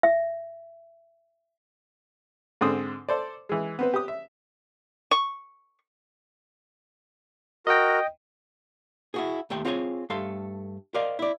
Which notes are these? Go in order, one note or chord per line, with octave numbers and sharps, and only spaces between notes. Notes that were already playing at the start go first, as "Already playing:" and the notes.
E5
G#2 D3 C4 D#6
A4 C5 D5
E3 G#3
B3 C4 B4
G4 D#6
E5
C#6
F#4 A#4 D#5 G5
E4 F#4 G#4
D#2 A3 C5 G5
C4 F4 G#4 C#5 F#5 G#5
G2 A3 A4 F5 C6
A#4 C5 D5 D#5 F5
E4 D5